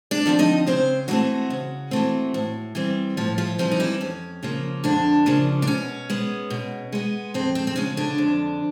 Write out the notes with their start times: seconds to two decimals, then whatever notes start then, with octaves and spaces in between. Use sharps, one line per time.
0.11 D4 D5
0.26 D3 F3 A3 C4
0.39 D#4 D#5
0.67 C#3 C4 C5
1.08 E3 F#3 A3 C4 F#4
1.50 C#3
1.91 E3 A3 C4
2.34 A2
2.75 E3 G3 C4
3.17 A2 F3 F4
3.38 F3 F4
3.59 E3 F3 G3 C4 F4
3.71 D#4
3.80 E3 E4
4.01 F2 C#4
4.43 C#3 F3 A#3
4.84 F2 D3 D4
5.26 C#3 F3 A#3
5.62 D4
5.67 B2 C#4
6.10 G#3 B3
6.50 B2
6.92 G#3 B3
7.34 F2 C4
7.55 C4
7.67 C4
7.76 C#3 F3 G#3 C#4
7.97 D3 D4
8.18 F2